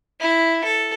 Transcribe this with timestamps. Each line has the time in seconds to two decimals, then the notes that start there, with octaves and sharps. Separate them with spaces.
0.20 E4
0.64 A4